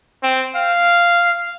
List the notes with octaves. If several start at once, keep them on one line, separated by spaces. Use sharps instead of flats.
C4
F5